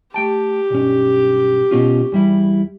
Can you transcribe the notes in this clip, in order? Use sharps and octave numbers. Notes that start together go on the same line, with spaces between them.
A3 G4 G5 A5
B1 G2 C#4
B2 C#4 F4
E2 G3 E4